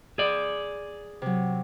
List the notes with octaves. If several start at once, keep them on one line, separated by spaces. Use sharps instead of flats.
G#4 D5
C3 F#3